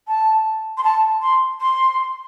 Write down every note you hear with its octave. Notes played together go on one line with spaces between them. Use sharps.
A5
C6
A5
C6
C6